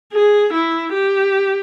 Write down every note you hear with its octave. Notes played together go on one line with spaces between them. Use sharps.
G#4
E4
G4